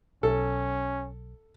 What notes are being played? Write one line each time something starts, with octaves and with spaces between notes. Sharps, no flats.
B1 C#4 A4